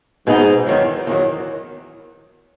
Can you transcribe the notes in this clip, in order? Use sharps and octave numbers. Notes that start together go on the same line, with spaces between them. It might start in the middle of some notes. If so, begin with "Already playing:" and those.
G#2 B2 G#3 B3 D#4
E2 D#3 F#3
E2 D#3 F#3